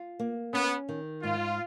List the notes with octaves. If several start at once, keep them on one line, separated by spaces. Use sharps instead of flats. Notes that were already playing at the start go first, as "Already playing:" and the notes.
Already playing: F4
A#3
B3 C#4
D#3
G#2 F4